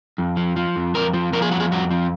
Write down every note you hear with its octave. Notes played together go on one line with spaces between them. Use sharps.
F2
F3
F3
F2
F2 A#4
F3
F3 A#4
G#4
F2 F#4
G#4
F2 F#4
F3